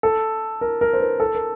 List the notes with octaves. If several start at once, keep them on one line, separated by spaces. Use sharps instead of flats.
A4
A#4
A#4
C5
B4
A4
A#4